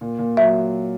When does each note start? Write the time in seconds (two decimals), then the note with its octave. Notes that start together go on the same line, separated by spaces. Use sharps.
0.01 A#2
0.19 A#2
0.37 F#3 E5